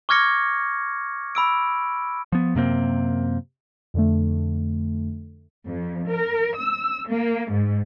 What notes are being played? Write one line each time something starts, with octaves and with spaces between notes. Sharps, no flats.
C#6 D6 F6 G#6 A#6 C#7
B5 E6 D7
F3 B3
F#2 C3 A#3 C4
F2 D3 A3
F2
A#4
E6
A#3
G#2